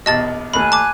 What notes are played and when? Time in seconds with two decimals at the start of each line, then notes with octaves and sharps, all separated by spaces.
0.06 A#1 D#2 B2 D#5 A5 A6
0.53 D#2 A3 G#5 B5 F#6
0.72 A5 D6